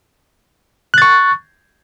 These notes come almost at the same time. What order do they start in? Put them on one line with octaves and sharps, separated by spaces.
F#6 A6 C#6